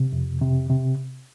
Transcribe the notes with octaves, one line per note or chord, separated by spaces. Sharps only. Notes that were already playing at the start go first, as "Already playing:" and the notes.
Already playing: C3
F2
C3
C3